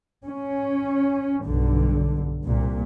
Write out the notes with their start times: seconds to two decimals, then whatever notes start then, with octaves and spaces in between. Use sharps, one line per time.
0.26 C#4
1.45 B1 G2 D3
2.44 C2 A#2